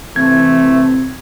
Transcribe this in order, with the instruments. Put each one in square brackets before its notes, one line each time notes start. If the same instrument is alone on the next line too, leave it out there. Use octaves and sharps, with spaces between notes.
[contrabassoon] C3 [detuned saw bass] E3 [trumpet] A3 [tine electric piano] G#6